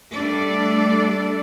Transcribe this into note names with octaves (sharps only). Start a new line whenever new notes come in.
G3 A3 D4 A4 D5